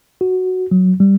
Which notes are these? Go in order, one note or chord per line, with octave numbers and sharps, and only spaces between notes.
F#4
F#3
G3